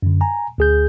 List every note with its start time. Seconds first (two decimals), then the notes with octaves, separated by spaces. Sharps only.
0.02 F#2 D3
0.21 G#5 A#5
0.58 D2 G#4 G6